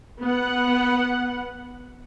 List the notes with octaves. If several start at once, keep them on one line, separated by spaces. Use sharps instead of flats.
B3 F#5